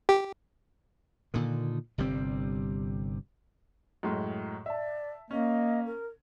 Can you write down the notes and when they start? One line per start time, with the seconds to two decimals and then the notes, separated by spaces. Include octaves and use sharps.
0.09 G4
1.34 A#2 D3 D#3
1.98 G1 C3 G3 C4
4.03 F#2 A2 G#3
4.66 D5 E5 A5
5.31 A#3 C#4 D#5
5.86 A#4